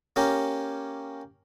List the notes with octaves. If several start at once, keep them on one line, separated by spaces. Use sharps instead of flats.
A#3 C#4 G4 A#5